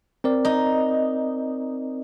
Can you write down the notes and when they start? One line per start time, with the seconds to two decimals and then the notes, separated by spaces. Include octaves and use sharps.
0.24 C4 A#4 D5
0.45 D#4